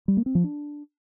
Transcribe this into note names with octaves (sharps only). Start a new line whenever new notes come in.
G3
A#3
C4
F3
D4